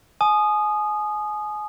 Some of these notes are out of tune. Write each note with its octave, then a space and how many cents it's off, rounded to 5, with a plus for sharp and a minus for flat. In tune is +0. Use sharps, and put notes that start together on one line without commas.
G#5 +30 D#6 -15